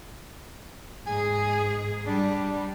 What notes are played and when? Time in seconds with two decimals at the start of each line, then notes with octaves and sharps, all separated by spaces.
1.07 G#2 G#4 G#5
2.07 G3 D4